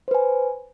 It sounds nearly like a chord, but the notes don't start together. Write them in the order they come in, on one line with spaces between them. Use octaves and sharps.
C5 B4 G#5